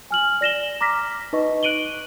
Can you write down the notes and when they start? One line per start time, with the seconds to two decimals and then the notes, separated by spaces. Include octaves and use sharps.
0.11 G#5 F6 F#7
0.41 D5 A#6 E7 G7
0.81 A#5 D6 F6 A#6 B6
1.33 D#4 B4 D#5 C#6
1.63 F#6 D7 D#7 F#7 G7